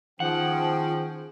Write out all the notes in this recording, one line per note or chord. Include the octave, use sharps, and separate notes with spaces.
D#3 F3 C#4 G#4 F#5 G5